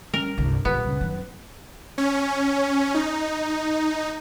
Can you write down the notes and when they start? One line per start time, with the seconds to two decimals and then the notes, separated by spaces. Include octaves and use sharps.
0.14 G3 C#4 A#4
0.38 C2 G2 D3
0.65 B1 A#2 F#3 G3 B3
0.85 C#2 G2 C#3
1.01 F#2 D#3
1.98 C#4
2.95 D#4